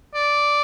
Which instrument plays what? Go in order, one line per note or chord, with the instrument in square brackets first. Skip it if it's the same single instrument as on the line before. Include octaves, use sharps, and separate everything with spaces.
[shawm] D5